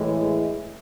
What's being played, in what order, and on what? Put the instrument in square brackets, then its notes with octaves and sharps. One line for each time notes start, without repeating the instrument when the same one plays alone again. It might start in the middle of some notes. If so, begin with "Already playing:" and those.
Already playing: [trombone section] A2 E3 G#3